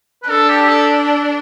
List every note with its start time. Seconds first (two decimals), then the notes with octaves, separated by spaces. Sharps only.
0.22 B4
0.29 D4 A4
0.49 G4
0.68 A4